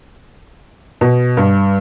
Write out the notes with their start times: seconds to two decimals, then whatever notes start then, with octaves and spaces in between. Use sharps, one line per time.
1.01 B2
1.37 G2